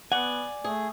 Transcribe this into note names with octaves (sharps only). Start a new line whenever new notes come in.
B3 D5 F#5 G#5
A3 G#4